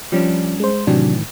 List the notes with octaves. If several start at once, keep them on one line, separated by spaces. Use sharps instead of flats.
F3 G3 C#4 D4
G#3 C5
A2 C3 D#3 E3 F#3 D4